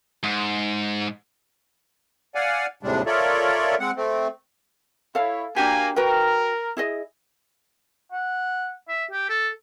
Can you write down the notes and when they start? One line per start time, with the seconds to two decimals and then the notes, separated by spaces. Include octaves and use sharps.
0.23 G#2
2.35 D5 F5 F#5 G#5
2.83 D#2 A2 C3 G3 G#3 D4
3.06 F4 A4 A#4 C#5 D5 E5
3.80 G#3 C4 F#5
3.96 A3 C4
5.15 E4 A4 C#5 F5
5.56 A#3 D4 F#4 G4 G#5
5.96 F#4 A#4 B4 G5
6.77 E4 G#4 D#5
8.12 F#5
8.88 E5
9.11 G4
9.29 A4